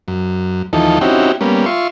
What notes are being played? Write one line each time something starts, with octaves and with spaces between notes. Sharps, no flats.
F#2
D#2 E3 F3 D#4 A4
C4 C#4 D#4 E4 F#4 G4
G3 A#3 B3 C#4
F4 E5 C6 C#6